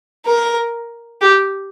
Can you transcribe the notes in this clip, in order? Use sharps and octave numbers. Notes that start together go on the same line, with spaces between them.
A#4
G4